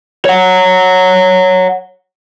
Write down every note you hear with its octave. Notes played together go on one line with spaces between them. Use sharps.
C#5 F#5